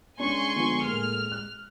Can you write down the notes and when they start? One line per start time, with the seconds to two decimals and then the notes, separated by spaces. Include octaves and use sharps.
0.19 G#3 C#4 D4 G#5 C6 C#6
0.56 D3 F3 B3
0.86 A2 A3 A#3 F6
1.32 F#6